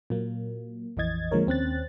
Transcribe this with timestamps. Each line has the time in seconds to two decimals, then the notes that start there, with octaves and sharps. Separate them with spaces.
0.10 A#2 F#3 A#3
0.97 A#1 F2 E3 D#5 G#6 A6
1.31 D3 F3 G#3 A#3 A#4 C#5
1.47 D#2 C4 C#4 F#6 A6